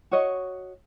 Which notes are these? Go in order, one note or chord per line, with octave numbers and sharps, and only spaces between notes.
F#4 C#5 D#5